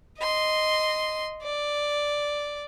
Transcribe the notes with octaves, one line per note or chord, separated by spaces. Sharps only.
D#5 C6
D5